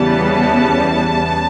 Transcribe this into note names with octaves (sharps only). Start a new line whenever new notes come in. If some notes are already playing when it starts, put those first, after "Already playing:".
Already playing: E2 C#3 E3 G3 B3 A5